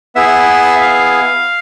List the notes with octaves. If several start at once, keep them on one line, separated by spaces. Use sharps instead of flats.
B3 E4 G#4 E5
F5